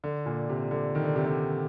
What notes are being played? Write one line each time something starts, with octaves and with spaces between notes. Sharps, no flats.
D3
A#2
C3
D3
D#3
D3
C3
D3